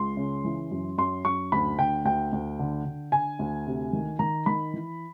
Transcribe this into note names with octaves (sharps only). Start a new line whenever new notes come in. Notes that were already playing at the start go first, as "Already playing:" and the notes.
Already playing: C#2 C6
C#3
E3
F#2
F#2 C6
F#2 C#6
D2 B5
D3 G5
D2 G5
D2
D3
D3
D3 G#5
D2
C3
D#3
D#3 A#5
D#3 B5
E3